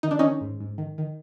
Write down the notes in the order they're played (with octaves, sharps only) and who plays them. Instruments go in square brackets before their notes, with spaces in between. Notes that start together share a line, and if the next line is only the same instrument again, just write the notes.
[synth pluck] D#3 D#4
D4
D#3 C#4 D#4
G#2
G#2
D#3
D#3